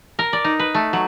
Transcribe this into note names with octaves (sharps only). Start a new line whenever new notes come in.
A#4
D5
D#4
B4
A3
F#3